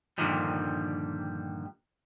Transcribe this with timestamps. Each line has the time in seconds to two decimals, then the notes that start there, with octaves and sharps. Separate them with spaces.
0.18 G2 A#2 D3 D#3 F3 G3